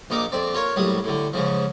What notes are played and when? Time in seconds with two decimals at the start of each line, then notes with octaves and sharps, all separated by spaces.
0.10 A#1 A#2 D#4 A#4 A#5 D6
0.32 F2 C4 D5
0.54 F4 A#4 C#5
0.76 A#1 A2 F#3 G3 D#6
1.04 A2 D3
1.33 G#2 C#3 F3